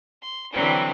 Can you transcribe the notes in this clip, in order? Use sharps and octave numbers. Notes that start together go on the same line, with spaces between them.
C6
D3 E3 F#3 G3 C4